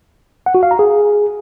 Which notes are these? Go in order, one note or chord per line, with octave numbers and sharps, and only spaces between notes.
F#5
F#4
F5
A#5
G#4